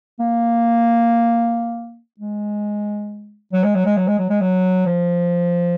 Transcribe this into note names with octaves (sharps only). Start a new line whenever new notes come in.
A#3
G#3
F#3
G#3
F#3
G#3
F#3
G#3
F#3
G#3
F#3
F3